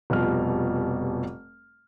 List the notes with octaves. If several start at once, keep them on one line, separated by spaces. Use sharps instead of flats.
F1 B2 F3 G3 F6